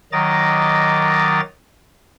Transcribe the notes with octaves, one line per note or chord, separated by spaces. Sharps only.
D#3 F#3 D#5 A#5 D6 A6